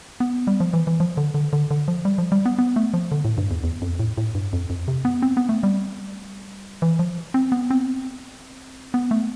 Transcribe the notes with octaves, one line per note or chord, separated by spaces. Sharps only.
B3
G3
F3
E3
E3
F3
D3
D3
D3
D3
F3
G3
F3
G3
B3
B3
A3
F3
D3
A2
G2
E2
E2
F2
A2
A2
G2
F2
F2
C3
B3
C4
B3
A3
G3
E3
F3
C4
B3
C4
B3
A3